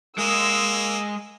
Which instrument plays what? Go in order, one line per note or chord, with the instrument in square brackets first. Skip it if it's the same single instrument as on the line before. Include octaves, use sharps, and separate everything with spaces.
[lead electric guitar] G#3 G#4 [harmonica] A#3 [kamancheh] E6